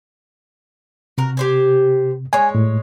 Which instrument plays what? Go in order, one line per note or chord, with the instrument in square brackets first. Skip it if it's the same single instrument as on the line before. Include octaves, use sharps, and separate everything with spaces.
[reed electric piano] C3 [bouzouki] F#4 A#4
[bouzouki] G4 C5 G#5
[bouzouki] G#3 C#5 [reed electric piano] G#5
[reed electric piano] A2